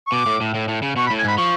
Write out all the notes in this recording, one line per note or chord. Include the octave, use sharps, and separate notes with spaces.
C#6
B2 D6
A2
A2
A2
A2
C#3
B2 C#6
B5
A2
G#5
G#2 B5
F3 C#6